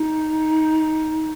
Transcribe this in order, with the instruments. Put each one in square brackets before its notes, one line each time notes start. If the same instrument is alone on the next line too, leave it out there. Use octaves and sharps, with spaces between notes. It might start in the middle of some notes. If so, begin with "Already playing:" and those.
Already playing: [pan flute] D#4